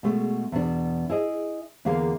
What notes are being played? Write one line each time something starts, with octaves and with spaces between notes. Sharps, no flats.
B2 G#3 A3
E2 B2 D4
E4 G#4 D#5
E2 D3 A#3 G#4 A#4 F5